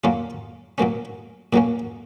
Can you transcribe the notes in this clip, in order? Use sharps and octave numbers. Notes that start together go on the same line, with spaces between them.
A#2 F#3 A#3 C#4 F4
A#2 F#3 A#3 C#4
A#2 F#3 A#3 C#4